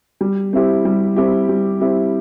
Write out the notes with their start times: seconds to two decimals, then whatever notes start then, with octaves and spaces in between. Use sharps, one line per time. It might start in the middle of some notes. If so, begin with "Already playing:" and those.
0.21 G3
0.53 C4 E4 G4
0.85 G3
1.16 C4 E4 G4
1.49 G3
1.81 C4 E4 G4